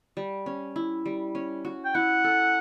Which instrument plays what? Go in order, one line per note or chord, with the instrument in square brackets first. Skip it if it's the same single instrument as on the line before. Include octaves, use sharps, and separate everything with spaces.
[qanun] G3
C#4
E4
G3
C#4
F#4
[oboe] G5
[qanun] E4 [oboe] F#5
[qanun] A4